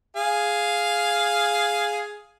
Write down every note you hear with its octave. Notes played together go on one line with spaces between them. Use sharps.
G#4 F5